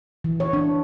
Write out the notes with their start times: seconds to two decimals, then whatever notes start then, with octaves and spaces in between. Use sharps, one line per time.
0.24 E3
0.40 C#5
0.53 D4